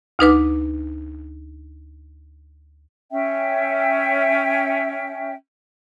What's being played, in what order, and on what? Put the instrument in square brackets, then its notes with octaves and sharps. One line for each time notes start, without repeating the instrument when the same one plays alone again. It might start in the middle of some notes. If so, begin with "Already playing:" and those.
[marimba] D2 D#4 B4 D6
[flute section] C#4 E5 G5